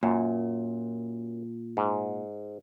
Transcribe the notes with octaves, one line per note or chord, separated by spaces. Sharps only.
F#2 A#2
G#2